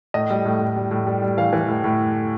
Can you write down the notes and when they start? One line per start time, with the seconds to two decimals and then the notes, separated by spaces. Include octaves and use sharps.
0.14 A2 D#5
0.30 G3
0.45 A2
0.60 A2
0.76 G3
0.91 A2
1.07 G3
1.22 G3
1.38 E3 F5
1.53 E3
1.68 A2
1.84 A2